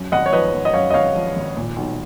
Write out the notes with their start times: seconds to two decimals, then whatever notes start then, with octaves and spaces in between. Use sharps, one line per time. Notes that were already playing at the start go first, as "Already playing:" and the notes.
Already playing: F#2
0.12 G#1 D#5 F#5
0.26 C#5
0.32 F3 B4 D#5
0.54 G#1
0.65 D#5
0.73 F#2 C#5 F5
0.90 D#5
0.94 G#1 C#5 F5
1.15 F3
1.36 G#1
1.57 A#2
1.77 B1